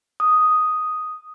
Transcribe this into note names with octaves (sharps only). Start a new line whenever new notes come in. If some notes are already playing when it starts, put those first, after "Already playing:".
D#6